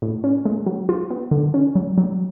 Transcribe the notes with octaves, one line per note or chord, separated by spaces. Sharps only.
A2
C#4
G#3
F#3
F4
B3
D3
C#4
F#3
F#3